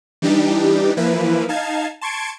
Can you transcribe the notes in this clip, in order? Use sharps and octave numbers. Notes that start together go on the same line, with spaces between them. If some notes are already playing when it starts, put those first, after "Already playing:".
E3 G3 D4 D#4 G4
E3 F3 A#3 E4 B4
D#4 F5 A5 G#6
A5 C6 C#6 G#6 D7